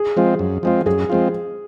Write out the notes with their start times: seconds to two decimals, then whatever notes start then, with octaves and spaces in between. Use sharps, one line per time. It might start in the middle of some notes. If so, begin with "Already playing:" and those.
Already playing: G#4
0.16 F3 G#3 C4 F4
0.39 F#2
0.63 F3 G#3 C4 F4
0.86 F#2 G#4
1.10 F3 G#3 C4 F4